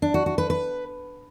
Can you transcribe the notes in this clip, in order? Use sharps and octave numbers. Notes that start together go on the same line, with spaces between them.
D4
F#4
F#4
B4
B4